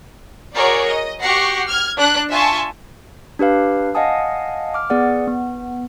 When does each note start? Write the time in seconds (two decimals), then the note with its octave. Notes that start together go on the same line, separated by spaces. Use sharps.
0.55 F#4 G#4 A#4 C#5 D5
0.87 D#5
1.22 F#4 G4 F#5 C#6 A#6 C7
1.67 F6 G#6
1.97 D4 F#6
2.30 F4 E5 G#5 A5 C6 C#6
3.39 D4 G4 B4 F5
3.95 D#5 F5 F#5 G#5 A5 D#6
4.74 D6 F6
4.90 B3 G#4 D5 F#5
5.27 B3